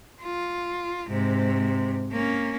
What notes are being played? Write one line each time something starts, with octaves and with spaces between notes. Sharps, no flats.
F4
G#2 C3
A#3 C#4